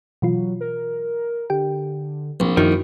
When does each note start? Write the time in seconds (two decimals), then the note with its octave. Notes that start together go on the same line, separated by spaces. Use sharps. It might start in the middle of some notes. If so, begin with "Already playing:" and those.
0.22 B2 E3 F#3 F4
0.61 A#4
1.50 D3 G4 G5
2.40 A#1 C4
2.57 F#2 D#3 E4 F#4